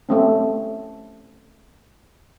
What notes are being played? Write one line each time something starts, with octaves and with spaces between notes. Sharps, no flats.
A3 C4 C#4